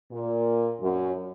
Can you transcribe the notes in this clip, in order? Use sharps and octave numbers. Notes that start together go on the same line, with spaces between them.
A#2
F#2